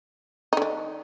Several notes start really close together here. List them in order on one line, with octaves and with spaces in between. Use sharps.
D#4 D3 D4